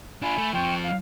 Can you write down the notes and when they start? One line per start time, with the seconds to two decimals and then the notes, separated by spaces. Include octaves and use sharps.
0.22 D4 F4 G#5 B5
0.38 A3
0.53 F3 C4 G5 C6 C#6
0.82 F5